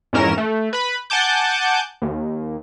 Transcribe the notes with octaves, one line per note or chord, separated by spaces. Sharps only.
F2 G#2 E3 C#4 A#4 E7
A3
B4 B5
F#5 G#5 A5 D6 G6
D#2